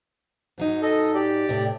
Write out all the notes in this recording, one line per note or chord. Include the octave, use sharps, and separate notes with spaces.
G#2 F#3 D#4
A4 D#5
G4 D5
A2 C3